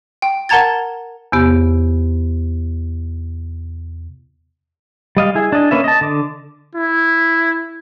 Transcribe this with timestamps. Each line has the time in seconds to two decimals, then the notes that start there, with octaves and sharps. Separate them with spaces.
0.22 G5
0.49 A#4 F#5 A5 A#5 G#6 A6
1.32 E2 C3 B3 G4
5.17 G3 D#5 F5
5.35 E4 G#4
5.52 D4 D#5
5.71 A#3 C#4 B4 E5
5.84 D#5 A5
6.01 D3 D6
6.75 E4